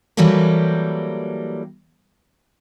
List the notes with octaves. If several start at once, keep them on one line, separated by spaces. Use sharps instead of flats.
E3 F#3 G3 A#3 G4 A4